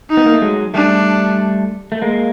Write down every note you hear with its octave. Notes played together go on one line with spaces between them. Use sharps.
D#4
B3
A#3
A3
F#3 G#3
G3 A3 D4
A3
G#3 A#3